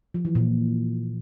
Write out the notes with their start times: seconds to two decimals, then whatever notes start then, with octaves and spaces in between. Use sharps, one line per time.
0.14 F3
0.25 E3
0.35 A#2